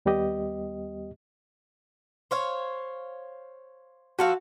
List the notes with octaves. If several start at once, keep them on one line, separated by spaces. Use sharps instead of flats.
D#2 G3 B3 G4 D#5
C5 C#5 F5
F3 F#4 A4 F5